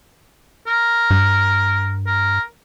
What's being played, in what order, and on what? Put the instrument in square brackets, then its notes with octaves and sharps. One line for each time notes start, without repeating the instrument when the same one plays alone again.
[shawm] A#4
[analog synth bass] G2
[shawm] A#4